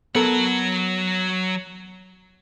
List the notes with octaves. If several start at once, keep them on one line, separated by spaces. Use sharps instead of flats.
F#3 B3 A4 A#4 F#5